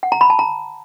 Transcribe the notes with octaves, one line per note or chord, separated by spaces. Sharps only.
F#5
A#5
B5
A5
A#5